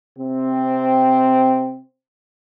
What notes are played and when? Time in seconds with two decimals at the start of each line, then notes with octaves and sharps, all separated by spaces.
0.19 C3 C4